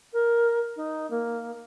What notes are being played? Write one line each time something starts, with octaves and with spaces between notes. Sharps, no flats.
A#4
D#4
A#3